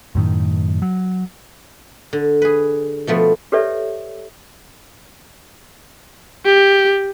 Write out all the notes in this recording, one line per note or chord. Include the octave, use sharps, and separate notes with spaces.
F#2 A2 D#3
F#3
D3
G#4 B4
B2 F3 A3 B3
G4 A4 B4 C#5 D5 E5
G4